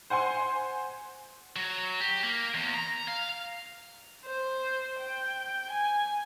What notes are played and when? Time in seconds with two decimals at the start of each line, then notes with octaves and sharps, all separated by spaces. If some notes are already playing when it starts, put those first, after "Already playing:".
0.10 C5 F#5 G#5 C6
1.56 F#3
2.01 G4
2.23 A#3
2.54 E2
2.74 A#5
3.08 F5
4.25 C5
4.99 G5
5.70 G#5